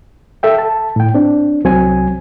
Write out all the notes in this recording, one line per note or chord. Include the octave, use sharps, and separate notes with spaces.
A4 E5 G5
A5
A2 G5
C4 D4
C2 F#3 C4 G#5